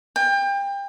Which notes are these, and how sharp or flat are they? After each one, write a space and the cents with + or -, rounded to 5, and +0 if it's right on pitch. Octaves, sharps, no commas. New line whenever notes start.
G5 +30